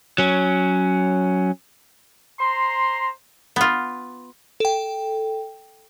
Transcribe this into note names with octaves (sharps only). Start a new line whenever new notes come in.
F#3 C#4
C5 A#5 C6
B3 F4
A4 G5